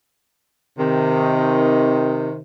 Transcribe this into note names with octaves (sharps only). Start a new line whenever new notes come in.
C3 D#3